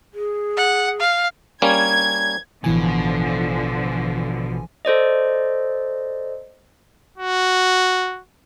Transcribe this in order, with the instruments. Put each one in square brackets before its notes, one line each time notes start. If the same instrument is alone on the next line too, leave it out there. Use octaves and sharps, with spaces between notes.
[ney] G#4
[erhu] F#5
F5
[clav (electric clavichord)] G3 A#3 C#4 [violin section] G#6
[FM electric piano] A1 E3 G#5 [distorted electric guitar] B2 [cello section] D3 F3
[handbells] A4 C5 D5 D#5
[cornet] F#4